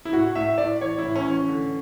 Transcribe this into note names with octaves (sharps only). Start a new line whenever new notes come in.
E4
A2 F#4
A2 E5
A2 D5
E3 C#5
A2 E4
C#4
E3
C#4
D3